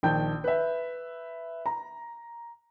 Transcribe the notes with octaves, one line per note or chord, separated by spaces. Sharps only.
A#1 D#3 G5 A5 G6
B4 E5
A#5